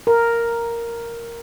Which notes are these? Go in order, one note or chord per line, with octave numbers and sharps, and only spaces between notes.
A#4